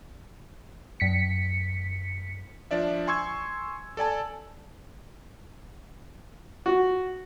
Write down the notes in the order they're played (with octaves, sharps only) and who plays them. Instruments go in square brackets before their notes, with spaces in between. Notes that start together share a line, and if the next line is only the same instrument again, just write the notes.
[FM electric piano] F#2 B6 C#7
[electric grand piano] F3 D4 D5 E5
G#5 C6 C#6 E6 G#6
A4 D5 G#5 A5
[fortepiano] F#4